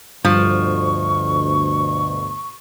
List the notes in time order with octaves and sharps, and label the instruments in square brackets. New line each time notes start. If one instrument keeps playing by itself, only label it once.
[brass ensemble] D2 B2 [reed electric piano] G2 [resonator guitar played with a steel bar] F3 [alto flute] C#6